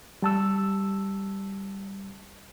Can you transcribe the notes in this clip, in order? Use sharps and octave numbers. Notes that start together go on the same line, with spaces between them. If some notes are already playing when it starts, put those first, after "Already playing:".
G3 A5 E6